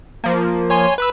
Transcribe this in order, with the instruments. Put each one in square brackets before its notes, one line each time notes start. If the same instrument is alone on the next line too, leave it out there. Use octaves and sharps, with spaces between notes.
[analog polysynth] F3 A#3
[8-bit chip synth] C#5 G#5 C6
B4 B5 E6